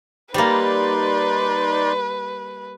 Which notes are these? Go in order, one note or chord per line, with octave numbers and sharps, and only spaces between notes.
G3 A#3 D#4 B4 D5 C6